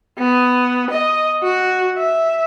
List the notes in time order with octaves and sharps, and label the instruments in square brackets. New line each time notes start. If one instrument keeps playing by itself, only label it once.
[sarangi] B3
D#5
F#4
E5